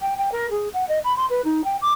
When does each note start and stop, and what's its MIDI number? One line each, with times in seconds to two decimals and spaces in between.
0.02 0.14 79
0.18 0.30 79
0.32 0.50 70
0.51 0.68 68
0.73 0.87 78
0.89 0.99 75
1.04 1.15 83
1.17 1.26 84
1.30 1.41 71
1.45 1.64 63
1.64 1.77 79
1.82 1.93 86